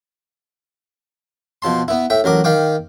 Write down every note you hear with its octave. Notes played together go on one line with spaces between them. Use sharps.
B2 F3 A5 C6
B3 E4
A2 E5 G5
A1 F#3 A#4 D6
D#3 F5 G5 D6